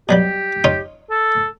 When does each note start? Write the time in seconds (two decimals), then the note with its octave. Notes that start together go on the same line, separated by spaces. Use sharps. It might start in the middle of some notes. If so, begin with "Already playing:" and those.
0.09 B2 F#3 G3 G4
0.64 D#4 F4 C#5
1.11 A4